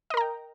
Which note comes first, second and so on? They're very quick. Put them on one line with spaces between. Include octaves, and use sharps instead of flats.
D#5 A#4 A#5 G5